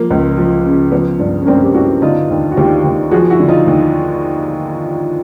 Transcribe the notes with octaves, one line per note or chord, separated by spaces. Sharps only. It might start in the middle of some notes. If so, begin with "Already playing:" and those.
Already playing: F3 A#3
C#2
F3
C#3
F3 B3
G2
C#4
G2 A#3 C4
G4
G2 E4 F#4
D3 D#4 F4
D#2
F#4
D#2 F4 G4
D#2
F3 F#4 G#4
E4 F#4
D3
D#4 F4
D#2